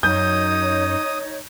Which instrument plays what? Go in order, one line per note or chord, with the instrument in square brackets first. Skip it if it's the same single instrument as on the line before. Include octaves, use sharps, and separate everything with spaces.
[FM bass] F#2 [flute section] D#4 C#5 [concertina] D#6 [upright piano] G6